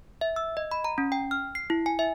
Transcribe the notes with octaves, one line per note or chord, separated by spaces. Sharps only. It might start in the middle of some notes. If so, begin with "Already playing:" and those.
E5
E6
D#5
B5
A#5
C#4
G5
F6
C7
E4
G#5
E5